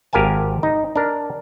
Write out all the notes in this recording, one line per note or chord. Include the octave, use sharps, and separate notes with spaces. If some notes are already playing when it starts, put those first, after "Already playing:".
G#1 G4 A#4 F5 G#5 A5
D#4
D4 A#4